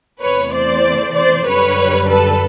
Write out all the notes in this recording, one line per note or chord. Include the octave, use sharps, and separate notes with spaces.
E2 C3 E3 A3 B4 C#5
C5 D5
C5 D5
F#2 D3 G3 B4 C#5
A4 B4